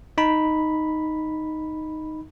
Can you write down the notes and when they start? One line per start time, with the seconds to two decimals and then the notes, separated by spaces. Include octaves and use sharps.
0.18 D#4 B5